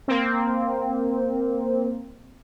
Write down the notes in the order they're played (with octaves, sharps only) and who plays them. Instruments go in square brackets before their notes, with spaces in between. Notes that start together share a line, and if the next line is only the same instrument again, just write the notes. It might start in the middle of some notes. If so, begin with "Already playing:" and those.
[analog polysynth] A#3 C4